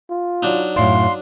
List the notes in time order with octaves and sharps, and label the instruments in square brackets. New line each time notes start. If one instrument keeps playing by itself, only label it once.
[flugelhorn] F4
[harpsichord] F#3 D4 D#4
[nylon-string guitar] F#2 A2 D5 [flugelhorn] F5 [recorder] C6